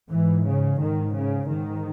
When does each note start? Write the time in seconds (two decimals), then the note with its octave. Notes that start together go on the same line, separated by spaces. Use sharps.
0.10 G#2 E3
0.45 C#3
0.79 G#2 D#3
1.14 C#3
1.49 G#2 D#3